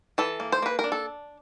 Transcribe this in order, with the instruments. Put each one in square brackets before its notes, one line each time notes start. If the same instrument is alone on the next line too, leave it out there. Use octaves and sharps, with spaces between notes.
[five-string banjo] E3 A4
A#3
C5
A#3 B4
A#4
D4
A4